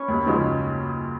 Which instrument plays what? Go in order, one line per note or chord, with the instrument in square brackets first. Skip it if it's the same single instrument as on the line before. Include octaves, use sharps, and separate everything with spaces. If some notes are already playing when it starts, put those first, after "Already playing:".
Already playing: [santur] C#4 B4 C#5
[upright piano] D#2
C#3 F3 G#3